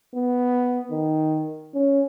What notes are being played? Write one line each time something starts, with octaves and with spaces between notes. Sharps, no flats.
B3
D#3
C#4